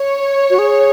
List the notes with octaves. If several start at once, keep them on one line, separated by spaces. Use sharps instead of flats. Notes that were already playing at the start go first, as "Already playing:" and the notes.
Already playing: C#5
F#4
G#4